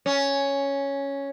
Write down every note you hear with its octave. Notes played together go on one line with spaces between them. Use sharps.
C#4